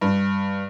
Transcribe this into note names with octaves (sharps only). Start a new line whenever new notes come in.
G2